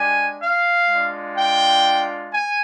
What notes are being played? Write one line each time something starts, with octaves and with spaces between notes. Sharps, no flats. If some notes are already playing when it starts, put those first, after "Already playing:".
Already playing: G#3 D4 G4 G#5
F5
G#3 D4 F4
G5
G#5